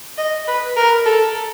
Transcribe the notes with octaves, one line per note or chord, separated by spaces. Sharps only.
D#5
B4
A#4
A4